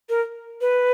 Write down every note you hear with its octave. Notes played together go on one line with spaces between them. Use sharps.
A#4
B4